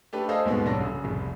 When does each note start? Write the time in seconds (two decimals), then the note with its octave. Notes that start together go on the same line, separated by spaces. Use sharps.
0.13 A3 D4 G4 B4
0.29 G#4 A4 C5 D#5 F5
0.45 D#2 G#2 B2 B3
0.66 C2 C#4 D4 A4 A#6
0.79 F#2 C#3
1.04 F1 C2